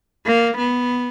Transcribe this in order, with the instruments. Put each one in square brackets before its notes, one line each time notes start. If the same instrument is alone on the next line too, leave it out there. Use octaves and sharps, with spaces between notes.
[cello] A#3
B3